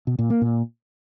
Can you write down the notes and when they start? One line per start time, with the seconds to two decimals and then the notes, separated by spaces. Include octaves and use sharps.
0.07 B2
0.19 A#2
0.30 A#3
0.42 A#2